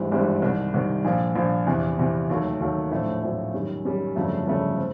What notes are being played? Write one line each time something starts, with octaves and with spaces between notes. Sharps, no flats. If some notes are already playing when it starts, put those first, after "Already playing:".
Already playing: G#1 G2 E3 G3 C4
G#1 G2 E3 G3 C4
C2 C3 D#3
C2 C3 D#3
A#1 A#2 F3
A#1 A#2 F3
E2 C3 E3
E2 C3 E3
D#2 D#3 F#3 A3
D#2 D#3 F#3 A3
A#1 A2 F#3 A3 C4
A#1 A2 F#3 A3 C4
F#2 D#3 G3
F#2 D#3 G3
G1 F2 C#3 F#3 A3
G1 F2 C#3 F#3 A3
C4